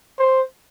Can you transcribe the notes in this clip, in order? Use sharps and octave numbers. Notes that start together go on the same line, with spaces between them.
C5